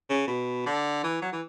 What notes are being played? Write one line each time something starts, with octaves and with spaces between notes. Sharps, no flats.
C#3
B2
D3
E3
F#3
E3